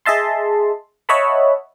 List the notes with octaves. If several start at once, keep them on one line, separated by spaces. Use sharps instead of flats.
G#4 D#5 E5 A5 C6
C#5 D#5 E5 F#5 A5 B5